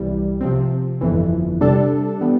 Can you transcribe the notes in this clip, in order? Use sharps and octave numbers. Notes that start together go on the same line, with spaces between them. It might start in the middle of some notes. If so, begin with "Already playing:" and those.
Already playing: C2 C3 E3 G3
C3 F3 C4
G1 F2 E3
C3 G3 D4 A4
E3 G3 B3